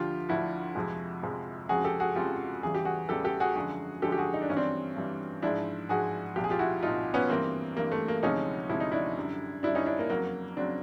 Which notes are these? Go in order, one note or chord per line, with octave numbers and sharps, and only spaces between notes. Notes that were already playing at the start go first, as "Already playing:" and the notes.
Already playing: D2 D3 F3 F4 G4
D2 D3 F3 E4 F#4
F2 C3 F3 G#3
F2 C3 F3 G#3
F2 C#3 F3 G#3 F#4 G#4
G4 A4
F#4 G#4
F2 C#3 F3 G#3 F4 G4
E2 C#3 E3 G3 G#4
G4
F#4 G#4
E2 C#3 E3 G3 G4 A4
G4 A4
F#4 G#4
F#2 D3 F3 G#3 F#4 G#4
F#2 D3 F3 G#3 G4 A4
G4
F#4 G#4
D#4
D4
G2 E3 G3 C#4
C4 D4
G2 E3 G3
G#2 F3 G#3 D4 E4
G#2 F3 G#3 F#4 G#4
C2 A#2 F3 G4
G#4
F4 G4
E4 F#4
C2 A#2 F3 D#4 F4
B3 C#4
G2 E3 G3 A#3 C4
G2 E3 G3 A#3
A3
A#3
D2 C3 F3 G#3 C#4 D#4
D2 C3 F3 G#3 E4
D#4
D4 E4
F#2 D3 G3
F#2 D3 G3 D4 E4
C#4 D#4
D4 E4
A#3
F2 C#3 F#3 A#3
C#3 F#3 C4 D4